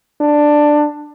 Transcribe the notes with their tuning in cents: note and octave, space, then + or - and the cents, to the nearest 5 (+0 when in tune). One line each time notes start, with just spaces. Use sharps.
D4 +10